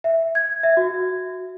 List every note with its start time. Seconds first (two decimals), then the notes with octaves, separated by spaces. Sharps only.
0.04 E5
0.35 G#6
0.63 E5
0.77 F#4